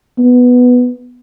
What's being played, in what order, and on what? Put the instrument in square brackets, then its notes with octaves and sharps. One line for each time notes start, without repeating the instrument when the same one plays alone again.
[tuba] B3